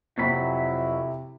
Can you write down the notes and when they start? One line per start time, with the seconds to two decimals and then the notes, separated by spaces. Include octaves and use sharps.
0.18 F2 C3 F#3 E4 B5